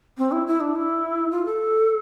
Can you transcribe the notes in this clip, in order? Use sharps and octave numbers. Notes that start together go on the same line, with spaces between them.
C4
E4
E4
D4
E4
F4
A4